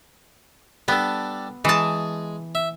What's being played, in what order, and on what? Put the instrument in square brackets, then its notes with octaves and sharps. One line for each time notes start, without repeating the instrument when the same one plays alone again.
[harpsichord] G3 D4 A4 [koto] B3
[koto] E3 A5 [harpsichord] G#3 G#4
[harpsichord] E5